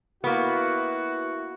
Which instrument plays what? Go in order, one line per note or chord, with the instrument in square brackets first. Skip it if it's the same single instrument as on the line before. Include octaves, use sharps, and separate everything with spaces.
[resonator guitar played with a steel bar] A#3 B3 [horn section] E4 F#4